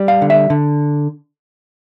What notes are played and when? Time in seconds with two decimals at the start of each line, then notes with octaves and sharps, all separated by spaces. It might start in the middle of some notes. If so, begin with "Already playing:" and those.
Already playing: G3
0.08 F5
0.22 D3
0.30 E5
0.50 D3